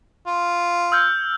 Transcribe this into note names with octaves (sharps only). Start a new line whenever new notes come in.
F4
E6 F6 G6